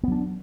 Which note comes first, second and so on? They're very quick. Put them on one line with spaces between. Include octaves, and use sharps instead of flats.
B3 F#3 D4